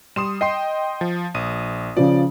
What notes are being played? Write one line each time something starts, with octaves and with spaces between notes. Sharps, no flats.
G3 C6 D#6 E7
D#5 G5 C6 C7
F3
A#1 D#6 D#7
C#3 F3 D5